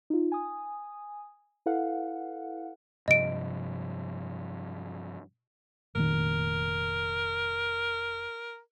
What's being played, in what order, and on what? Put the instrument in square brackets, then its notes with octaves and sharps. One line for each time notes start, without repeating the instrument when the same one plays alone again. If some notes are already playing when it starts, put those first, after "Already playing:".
[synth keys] D#4 F4
G#5 D#6
E4 A4 B4 F5 F#5
[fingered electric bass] G2 C3 F3 [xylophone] D#5 D7
[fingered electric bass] F1 A#2 D#3 [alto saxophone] A#4